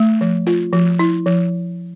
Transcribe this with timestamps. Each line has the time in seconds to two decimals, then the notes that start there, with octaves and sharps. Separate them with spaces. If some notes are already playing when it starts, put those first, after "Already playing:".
Already playing: A3
0.21 F3
0.47 F4
0.73 F3
0.99 E4
1.26 F3